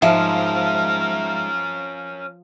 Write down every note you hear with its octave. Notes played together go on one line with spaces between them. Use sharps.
G#2 F3 C#4 A#4 E5